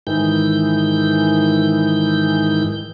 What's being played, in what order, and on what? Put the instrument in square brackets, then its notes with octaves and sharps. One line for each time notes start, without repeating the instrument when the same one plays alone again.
[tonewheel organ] G#2 D#3 E3 G6